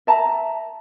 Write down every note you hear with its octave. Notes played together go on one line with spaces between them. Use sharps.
E5 A5 A#5